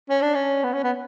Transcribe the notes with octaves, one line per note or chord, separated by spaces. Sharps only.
C#4
D4
C#4
B3
C#4
B3